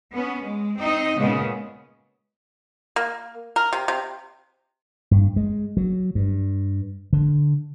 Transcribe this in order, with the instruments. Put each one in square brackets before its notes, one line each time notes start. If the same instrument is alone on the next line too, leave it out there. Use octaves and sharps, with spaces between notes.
[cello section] B3 C#4
G#3
C4 D#4 D#5
A#2 C#3 G#3 B3
[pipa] A#3
A#4
C3
C3
[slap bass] G2
G#3
F#3
G2
D3